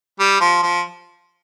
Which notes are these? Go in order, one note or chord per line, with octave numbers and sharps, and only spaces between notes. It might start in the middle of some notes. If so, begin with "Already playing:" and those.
G3
F3
F3